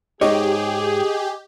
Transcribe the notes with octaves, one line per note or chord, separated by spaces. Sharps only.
G#2 D#4 G4 G#4 C#5 D#5 D6